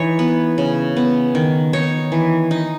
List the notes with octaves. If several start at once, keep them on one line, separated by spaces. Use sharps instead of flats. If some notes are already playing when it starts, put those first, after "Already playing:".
Already playing: E3 D#4 C#5
B3
C#3
B3
D#3
D#4 C#5
E3
D#4